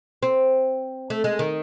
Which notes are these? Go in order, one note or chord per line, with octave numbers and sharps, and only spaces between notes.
C4
A3
G#3
D#3